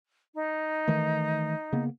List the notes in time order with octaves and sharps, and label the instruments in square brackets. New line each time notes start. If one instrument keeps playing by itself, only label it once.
[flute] D#4
[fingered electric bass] D#3 E3 A3
C#3 A#3 B3